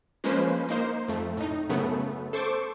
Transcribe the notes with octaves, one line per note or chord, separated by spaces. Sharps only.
F3 G#3 A#3 C#4 B4 C5
A#3 D#4 C5
F2 A3
A2 D#4
F#2 C#3 A3 B3
A4 C5 C#6 D6